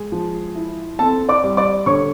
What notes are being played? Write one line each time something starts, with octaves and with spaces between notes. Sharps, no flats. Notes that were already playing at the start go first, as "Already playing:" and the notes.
Already playing: G#3 G#4
F3
E4
C4 A4 A5
D5 D6
G3
D5 D6
D3 C#5 C#6